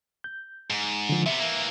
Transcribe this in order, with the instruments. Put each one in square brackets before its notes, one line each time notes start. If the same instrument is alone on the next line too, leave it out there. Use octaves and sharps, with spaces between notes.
[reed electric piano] G6
[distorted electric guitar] G#2
[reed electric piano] D3 F3
[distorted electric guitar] C3 B3 [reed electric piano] E5
[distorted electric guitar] E3 A#3